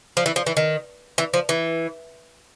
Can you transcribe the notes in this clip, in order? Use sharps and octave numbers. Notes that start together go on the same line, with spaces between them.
F3
E3
F3
E3
D#3
E3
F3
E3